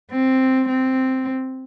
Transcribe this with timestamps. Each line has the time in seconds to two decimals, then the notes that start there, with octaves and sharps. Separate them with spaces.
0.11 C4
0.68 C4